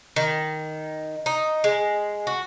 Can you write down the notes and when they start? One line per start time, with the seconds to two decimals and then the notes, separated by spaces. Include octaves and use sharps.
0.16 D#3
1.26 D#4
1.64 G#3
2.27 F#4